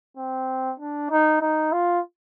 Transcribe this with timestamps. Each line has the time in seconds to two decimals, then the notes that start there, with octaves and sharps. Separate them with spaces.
0.17 C4
0.79 D4
1.10 D#4
1.41 D#4
1.72 F4